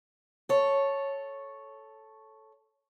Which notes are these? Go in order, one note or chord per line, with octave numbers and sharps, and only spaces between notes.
A4 C#5